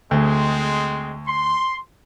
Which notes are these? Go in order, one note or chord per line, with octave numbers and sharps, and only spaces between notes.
D2 G#3 C4
C6